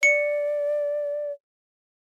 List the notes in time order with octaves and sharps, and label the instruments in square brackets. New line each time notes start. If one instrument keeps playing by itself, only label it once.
[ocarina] D5 [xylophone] C#7